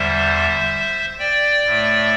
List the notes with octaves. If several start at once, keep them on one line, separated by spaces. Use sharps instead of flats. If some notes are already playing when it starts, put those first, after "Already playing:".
Already playing: E2 D3 G3 C5 E5
D5 G5
A2 A3